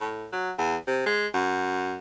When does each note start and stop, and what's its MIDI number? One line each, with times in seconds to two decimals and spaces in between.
0.01 0.28 45
0.33 0.52 54
0.58 0.77 40
0.87 1.04 48
1.06 1.27 56
1.34 1.96 42